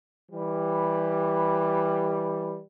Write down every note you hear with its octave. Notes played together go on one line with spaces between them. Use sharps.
E3 G3